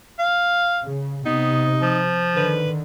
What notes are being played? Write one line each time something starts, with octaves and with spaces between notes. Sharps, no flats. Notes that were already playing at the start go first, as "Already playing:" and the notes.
F5
C#3
C3 B3 D#4
F3
D3 D#3 B4